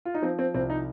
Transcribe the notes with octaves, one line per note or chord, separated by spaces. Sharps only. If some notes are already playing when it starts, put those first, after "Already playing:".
F4
D#4
F3 C4
C4
C2 C4
D#4